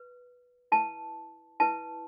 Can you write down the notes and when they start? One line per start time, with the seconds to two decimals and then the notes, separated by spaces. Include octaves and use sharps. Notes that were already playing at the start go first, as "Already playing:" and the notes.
Already playing: B4
0.72 E4 B4 A5
1.60 E4 B4 A5